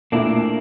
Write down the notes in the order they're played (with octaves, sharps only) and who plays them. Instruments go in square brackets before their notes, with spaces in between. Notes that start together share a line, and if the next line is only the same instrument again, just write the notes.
[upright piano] A#2 A3 E4 [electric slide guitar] A#3 D4